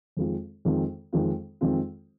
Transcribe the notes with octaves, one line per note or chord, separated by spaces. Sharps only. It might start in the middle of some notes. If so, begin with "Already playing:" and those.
F2 D#3 G#3 C4 F4
F2 D#3 G#3 C4 F4
F2 D#3 G#3 C4 F4
F2 D#3 G#3 C4 F4